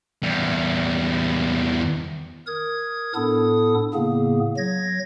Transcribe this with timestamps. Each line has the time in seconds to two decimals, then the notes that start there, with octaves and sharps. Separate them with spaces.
0.23 E2 G3
2.47 A#4 D#6 G#6
3.15 A2 B3 D4 E4 A4 D#6
3.94 A2 C#3 A#3 B3 G#4
4.57 F#3 G#6 A#6